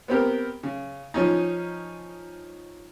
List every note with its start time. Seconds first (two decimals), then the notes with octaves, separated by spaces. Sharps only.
0.08 B3 C4 G4 A#4
0.63 C#3
1.14 F3 C#4 D#4